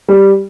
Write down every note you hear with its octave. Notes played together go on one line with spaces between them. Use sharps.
G3